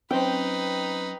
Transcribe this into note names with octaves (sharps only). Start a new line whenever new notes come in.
F#3 C4 C#4 D#4 B4 C5 G5